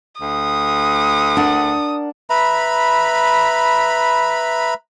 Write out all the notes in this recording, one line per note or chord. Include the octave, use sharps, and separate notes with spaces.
D2 D#6
D4 A#4 F#5
B4 E5 A#5 B5